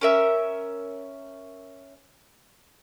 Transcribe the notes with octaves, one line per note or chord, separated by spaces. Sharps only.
C#4 A#4 E5